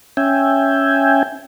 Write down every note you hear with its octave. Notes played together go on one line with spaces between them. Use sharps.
C#4 E5 G5 G#5